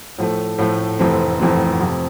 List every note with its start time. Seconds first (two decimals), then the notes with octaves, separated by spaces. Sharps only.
0.18 A2 F3 A3
0.58 A2 F3 A3
0.99 F1 F2 E3 A3 C4
1.40 F1 F2 E3 A3 C4
1.81 F2 C3 F3